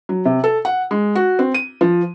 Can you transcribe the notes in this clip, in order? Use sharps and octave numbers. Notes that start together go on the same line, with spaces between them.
F#3
C3
A4
F#5
G#3
F#4
C4
D#7
F3